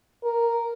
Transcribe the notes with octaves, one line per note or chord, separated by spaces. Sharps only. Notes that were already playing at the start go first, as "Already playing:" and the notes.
A#4